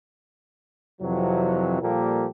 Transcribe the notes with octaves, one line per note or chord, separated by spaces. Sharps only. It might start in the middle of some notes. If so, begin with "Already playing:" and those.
F2 C3 E3 F#3
A#2 F3 G3 A#3 G4 A4